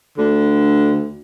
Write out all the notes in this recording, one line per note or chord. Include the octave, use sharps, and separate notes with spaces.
D2 D3